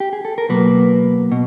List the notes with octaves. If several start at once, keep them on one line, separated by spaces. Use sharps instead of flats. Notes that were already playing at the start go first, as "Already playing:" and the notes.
G4
G#4
A4
A#4
B2 F#3 A#3 B4
B2